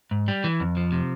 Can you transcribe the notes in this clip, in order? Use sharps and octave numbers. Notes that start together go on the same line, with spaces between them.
G#2
G3
E3
F2
F3
C3